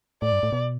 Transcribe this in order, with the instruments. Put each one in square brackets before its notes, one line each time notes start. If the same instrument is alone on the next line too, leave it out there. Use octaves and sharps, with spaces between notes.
[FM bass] A2 [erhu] D5
[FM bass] G2
A2
B2